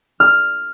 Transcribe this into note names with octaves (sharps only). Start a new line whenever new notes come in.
F6